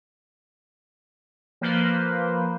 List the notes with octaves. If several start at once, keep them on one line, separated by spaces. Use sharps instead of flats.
F3 A#3 B4 C5